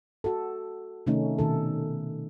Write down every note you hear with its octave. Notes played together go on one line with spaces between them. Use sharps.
F#4 A4
C3 D#3 A3 C#4 D#4
B2 D#3 A4